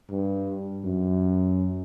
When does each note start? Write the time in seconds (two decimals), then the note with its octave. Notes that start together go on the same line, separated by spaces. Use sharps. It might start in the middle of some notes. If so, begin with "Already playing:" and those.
0.10 G2
0.84 F#2